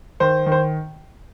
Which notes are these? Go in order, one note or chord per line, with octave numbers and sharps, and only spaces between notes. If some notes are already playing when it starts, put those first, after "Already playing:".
D#3 C5
D#3
C5